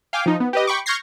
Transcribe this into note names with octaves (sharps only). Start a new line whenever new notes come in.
F5 G5 G#5 D6 F6
F3 D#4
B3
G4 B4 D#5
G5 B5 C#6 D6
C#6 F6 G6 G#6 A#6 C7